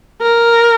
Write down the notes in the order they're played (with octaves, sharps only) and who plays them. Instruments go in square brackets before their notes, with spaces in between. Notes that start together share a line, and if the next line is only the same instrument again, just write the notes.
[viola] A#4